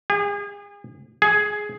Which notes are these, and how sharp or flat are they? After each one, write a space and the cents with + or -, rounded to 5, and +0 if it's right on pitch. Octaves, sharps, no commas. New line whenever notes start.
G#4 -35
G#4 +10